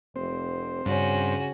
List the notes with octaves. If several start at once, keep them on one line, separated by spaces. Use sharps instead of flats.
F1 C4 C5
G2 C#3 C#4 F#4